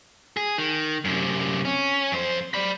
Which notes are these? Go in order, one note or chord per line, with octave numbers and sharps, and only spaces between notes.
G#4
D#3
F#2 C3
C#4
F2 C5
D5 B5